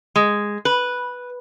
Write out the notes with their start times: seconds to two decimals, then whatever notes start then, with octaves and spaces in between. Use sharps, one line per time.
0.16 G#3
0.65 B4